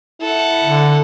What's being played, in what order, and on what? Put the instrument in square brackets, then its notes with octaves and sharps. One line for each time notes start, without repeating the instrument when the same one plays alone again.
[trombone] E4 [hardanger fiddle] A4 F#5
[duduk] D3